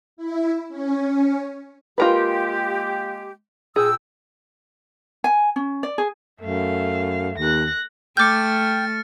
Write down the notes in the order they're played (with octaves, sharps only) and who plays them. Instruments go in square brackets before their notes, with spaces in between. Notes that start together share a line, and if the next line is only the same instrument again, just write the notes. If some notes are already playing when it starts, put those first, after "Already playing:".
[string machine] E4
C#4
[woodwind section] G#3 A#3 G4 [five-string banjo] F4 A#4 B4
[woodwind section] A#2 G5 E6 [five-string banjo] G#4
[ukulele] G#5
C#4
D5
G#4
[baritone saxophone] F#2 [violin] A3 F5
[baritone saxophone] D#2 [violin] F#6 A#6
[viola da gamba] A3 [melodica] G5 [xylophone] D6 G6 [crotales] F6 A6 C#7